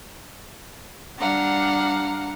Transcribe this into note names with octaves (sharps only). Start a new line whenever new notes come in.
G3 D4 F5 F#5 A#5